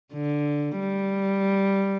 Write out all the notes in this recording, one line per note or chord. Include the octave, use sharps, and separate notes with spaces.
D3
G3